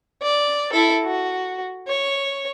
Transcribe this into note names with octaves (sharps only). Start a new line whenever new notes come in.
D5
E4 A4
F#4
C#5